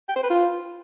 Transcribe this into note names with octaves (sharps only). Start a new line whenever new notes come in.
G5
C5
B4
F4